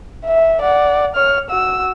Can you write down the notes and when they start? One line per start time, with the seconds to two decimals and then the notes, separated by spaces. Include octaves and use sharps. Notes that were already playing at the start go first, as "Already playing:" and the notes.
0.26 E5
0.62 D5 F#5
1.15 C#5 F6
1.50 F#4 E6